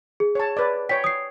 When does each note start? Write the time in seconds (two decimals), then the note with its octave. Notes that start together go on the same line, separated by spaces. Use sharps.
0.20 G#4
0.35 C#5 A5
0.57 B4 D5
0.89 C#5 G5 B6
1.04 D#6 C7